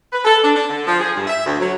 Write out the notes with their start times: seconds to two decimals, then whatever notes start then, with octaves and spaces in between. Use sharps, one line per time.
0.12 B4
0.25 A4
0.43 D4
0.55 D4
0.70 D3
0.87 F3
1.00 G#4
1.15 G2
1.27 E5
1.45 D2
1.59 F#3